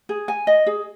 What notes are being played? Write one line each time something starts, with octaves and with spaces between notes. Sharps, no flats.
G#4
G#5
D#5
G#4